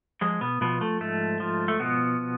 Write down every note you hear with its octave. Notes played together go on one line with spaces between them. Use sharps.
F3 G#3 G#4
B2 B3
B2 F3 B3
A3
G#2 A3
F3
A3
B2 F3 B3